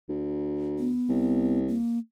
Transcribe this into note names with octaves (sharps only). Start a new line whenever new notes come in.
D2
B3
C2
A#3